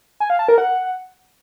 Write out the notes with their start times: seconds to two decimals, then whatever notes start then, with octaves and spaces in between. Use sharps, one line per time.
0.20 G#5
0.30 F5
0.39 A5
0.48 A#4
0.58 F#5